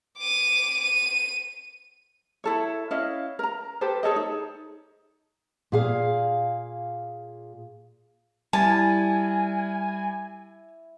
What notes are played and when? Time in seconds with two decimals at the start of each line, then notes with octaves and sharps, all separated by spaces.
0.19 D6 D#7
0.82 D#7
2.44 E4 A4 C#5
2.91 C#4 E4 D#5 F5
3.39 A#4 A#5
3.81 G4 A4 B4 C5
4.03 G#4 A4 C#5 D#5
4.16 D#4
5.72 A#2 G#4 F5
8.53 G3 E4 G#5 A5